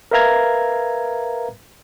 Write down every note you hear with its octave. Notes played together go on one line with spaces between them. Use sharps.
A#4 B4 E5 F5 A#5 G#6